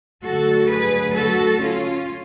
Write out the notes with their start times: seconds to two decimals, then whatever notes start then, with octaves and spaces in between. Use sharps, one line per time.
0.24 D2 D3 F#3 F#4 A4
0.70 G#4 B4
1.16 F#4 A4
1.61 C#4 F4